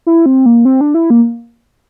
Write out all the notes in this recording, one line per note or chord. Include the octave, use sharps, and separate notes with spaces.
E4
C4
A#3
C4
D4
E4
A#3